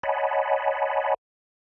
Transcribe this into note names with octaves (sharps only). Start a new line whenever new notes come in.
C#5 D#5 F#5 G#5 A5 B5